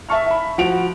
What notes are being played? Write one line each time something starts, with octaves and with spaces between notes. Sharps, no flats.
E5 A5 C#6 F6
E5 B5
F3 F#4 F#5 D7 F7